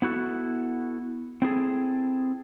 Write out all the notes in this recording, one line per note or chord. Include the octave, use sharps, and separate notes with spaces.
B3 E4 F#4 A4
C4 E4 G#4 A4